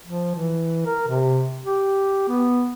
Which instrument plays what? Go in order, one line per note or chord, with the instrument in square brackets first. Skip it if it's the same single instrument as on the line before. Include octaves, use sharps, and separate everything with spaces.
[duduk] F3
E3
A#4
C3
G4
B3